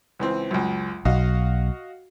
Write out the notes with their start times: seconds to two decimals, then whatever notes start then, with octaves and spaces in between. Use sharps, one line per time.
0.19 C#2 E3 C4
0.51 C#2 F#2
1.05 B1 F#4 D#5 F5